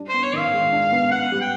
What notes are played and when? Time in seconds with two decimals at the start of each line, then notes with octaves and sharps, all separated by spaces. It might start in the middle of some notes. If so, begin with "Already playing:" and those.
Already playing: G3 D4
0.09 B3 C5
0.23 C#5
0.33 D#3 F5
0.53 G#3
0.72 D4
0.92 B3
1.11 B3 F#5
1.32 G3
1.41 G5